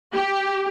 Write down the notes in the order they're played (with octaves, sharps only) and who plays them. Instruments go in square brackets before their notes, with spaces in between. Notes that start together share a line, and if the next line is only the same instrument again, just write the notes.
[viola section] G4